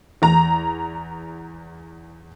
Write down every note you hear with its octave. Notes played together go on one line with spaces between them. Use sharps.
E2 A#5